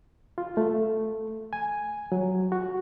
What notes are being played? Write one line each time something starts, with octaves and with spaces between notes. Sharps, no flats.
F4
A3
G#5
F#3
F#4